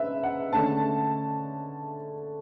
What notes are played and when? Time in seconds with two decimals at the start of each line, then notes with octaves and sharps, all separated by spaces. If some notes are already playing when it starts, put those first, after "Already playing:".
Already playing: C#3 B4 E5
0.23 F#5
0.53 D3 A3 C#4 A5